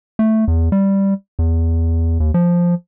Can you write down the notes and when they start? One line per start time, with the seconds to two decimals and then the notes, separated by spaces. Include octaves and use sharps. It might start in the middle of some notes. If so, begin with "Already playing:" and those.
0.19 A3
0.48 E2
0.72 G3
1.39 E2
2.20 D#2
2.34 F3